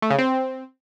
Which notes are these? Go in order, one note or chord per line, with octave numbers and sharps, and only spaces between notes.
A3
C#3
C4